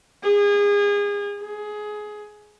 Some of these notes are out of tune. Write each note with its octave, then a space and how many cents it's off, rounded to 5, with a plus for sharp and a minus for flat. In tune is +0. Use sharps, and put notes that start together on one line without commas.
G#4 -30
G#4 +15